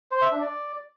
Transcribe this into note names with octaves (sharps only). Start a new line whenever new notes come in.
C5
E5
D4
D5